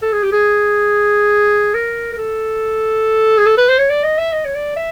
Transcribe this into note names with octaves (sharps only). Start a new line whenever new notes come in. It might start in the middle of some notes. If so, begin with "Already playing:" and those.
A4
G#4
G4
G#4
A#4
A#4
A4
G#4
A4
B4
C5
C#5
D5
D#5
E5
D#5
C#5
D5
E5